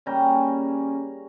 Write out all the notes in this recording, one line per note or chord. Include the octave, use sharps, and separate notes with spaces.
C#3 G3 A#3 C#4 G5 A#5